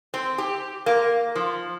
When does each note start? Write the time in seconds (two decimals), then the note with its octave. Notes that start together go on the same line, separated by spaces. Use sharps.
0.14 C4
0.38 G4
0.86 A#3
1.36 F3